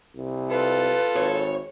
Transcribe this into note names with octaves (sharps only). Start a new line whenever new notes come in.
C2
F4 A4 B4
G#1 C#5